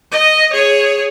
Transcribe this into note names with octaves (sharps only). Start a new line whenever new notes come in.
D#5
G#4 C#5